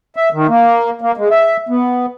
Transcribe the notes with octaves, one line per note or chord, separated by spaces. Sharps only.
E5
D#3
A#3
A#3
G#3
E5
B3